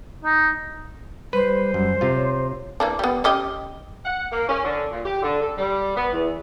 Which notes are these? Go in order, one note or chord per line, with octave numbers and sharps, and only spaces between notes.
D#4
G3 B4 C5
F#2
C3 F4
C#5
E3 A#3 D4
G3 B3
C#4 G4 D#5
F#5
A#3
C#4
D3
A#2
G4
D3
A4
G3
B3
E2